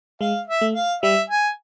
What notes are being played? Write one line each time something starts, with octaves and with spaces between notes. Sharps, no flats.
G#3 F5
E5
A3
F5
G3 E5
G#5